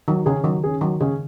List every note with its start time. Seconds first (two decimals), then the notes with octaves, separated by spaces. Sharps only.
0.08 D#3 F#3
0.26 C#3 G#4
0.29 C#4
0.44 D#3 F#3
0.64 C#4 G#4
0.81 D#3 F#3
1.00 C#3 C#4 G#4